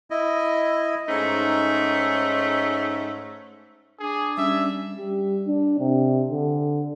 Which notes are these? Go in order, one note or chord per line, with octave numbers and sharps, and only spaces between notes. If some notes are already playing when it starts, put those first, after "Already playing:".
E4 D#5
G#2 G#3 A3 C#4 D#4
D4 G#4
G3 C#4 E5
G3
D4
C3
D3